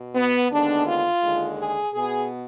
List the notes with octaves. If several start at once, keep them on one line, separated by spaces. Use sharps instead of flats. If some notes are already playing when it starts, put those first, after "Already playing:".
Already playing: B2
B3
D#2 D3 G#3 B3 D4
F4
D#2 D3 G#3
G#4
B2 B3 G#4